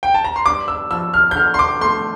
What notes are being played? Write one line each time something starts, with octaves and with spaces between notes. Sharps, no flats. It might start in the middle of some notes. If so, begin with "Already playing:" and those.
G5
A5
A#5
C6
G2 D6
E6
F3 E6
F6
G6
D3 F6
C6
D6
A3 C6